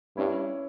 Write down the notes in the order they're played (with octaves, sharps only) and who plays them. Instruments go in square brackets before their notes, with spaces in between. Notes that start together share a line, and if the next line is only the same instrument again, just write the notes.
[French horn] G2 [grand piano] C#4 E4